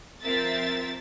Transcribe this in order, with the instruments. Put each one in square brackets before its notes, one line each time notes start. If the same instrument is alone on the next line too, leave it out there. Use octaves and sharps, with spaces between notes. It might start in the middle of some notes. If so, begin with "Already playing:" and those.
[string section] F3 C4 A#4 E5 A6